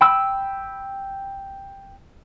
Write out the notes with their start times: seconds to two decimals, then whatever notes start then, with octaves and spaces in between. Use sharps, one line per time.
0.01 G5 B5 E6